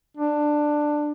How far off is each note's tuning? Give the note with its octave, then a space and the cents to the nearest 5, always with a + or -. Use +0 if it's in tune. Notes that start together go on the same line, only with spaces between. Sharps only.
D4 +15